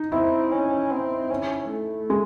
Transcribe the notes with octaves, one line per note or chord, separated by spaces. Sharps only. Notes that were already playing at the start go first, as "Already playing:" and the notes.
Already playing: D#4
C4 E4
C#4
C4
C#4
A3
G#3